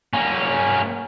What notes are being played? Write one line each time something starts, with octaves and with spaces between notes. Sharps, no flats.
A#3 C#4